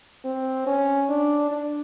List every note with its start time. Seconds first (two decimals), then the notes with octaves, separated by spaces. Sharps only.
0.25 C4
0.67 C#4
1.09 D4
1.51 D4